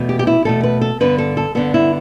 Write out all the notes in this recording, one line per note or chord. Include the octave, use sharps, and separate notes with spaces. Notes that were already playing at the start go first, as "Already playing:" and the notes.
Already playing: E2 B2 A3
G4
G4
E4
E2 B2 A3 A4
B4
A4
G2 D3 B3 B4
A4
A4
G2 D3 B3 A4
E4